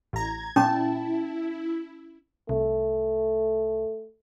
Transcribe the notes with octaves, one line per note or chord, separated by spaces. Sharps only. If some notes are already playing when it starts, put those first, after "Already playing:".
A1 A#5 G#6
A#2 C#4 E4 A5
C2 A3